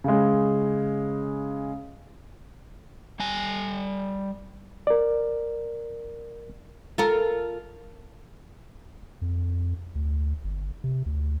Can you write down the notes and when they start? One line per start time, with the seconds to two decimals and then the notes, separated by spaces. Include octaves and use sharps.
0.04 C#3 G#3
3.20 G3 G#5
4.87 A#4 D5
6.98 F4 A4 A#4
9.22 F2
9.95 D2
10.44 G1
10.84 C3
11.06 D2